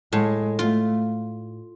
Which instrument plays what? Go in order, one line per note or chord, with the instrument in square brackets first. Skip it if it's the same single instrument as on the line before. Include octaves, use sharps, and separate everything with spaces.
[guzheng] A2 [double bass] G#3
[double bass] A3 [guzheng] F4